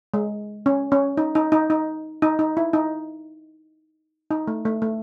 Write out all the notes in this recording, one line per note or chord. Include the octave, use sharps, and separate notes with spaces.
G#3
C#4
C#4
D#4
D#4
D#4
D#4
D#4
D#4
E4
D#4
D#4
A3
A3
A3